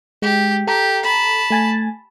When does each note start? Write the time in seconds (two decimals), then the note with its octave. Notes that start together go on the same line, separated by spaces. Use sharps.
0.22 G#3 G4
0.67 G4 A4 A#5
1.03 A5 B5
1.51 A3 G#5 A6